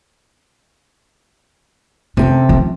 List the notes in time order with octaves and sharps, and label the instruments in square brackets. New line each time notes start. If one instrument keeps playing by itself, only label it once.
[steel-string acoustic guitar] C3 A4 [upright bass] C#4
[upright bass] F3 C#4